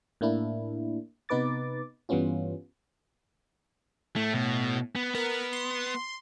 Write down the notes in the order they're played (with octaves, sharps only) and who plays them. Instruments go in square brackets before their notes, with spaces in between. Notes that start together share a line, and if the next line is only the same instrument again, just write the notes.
[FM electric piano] A2 A#3 D4 E4
C3 B3 D#4 B4 D6 A6
G2 E3 G3 B3 C#4 F4
[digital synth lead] A2 [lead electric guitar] A3
[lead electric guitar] B2
B3
[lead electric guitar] B3 [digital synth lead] A#4
[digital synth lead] C6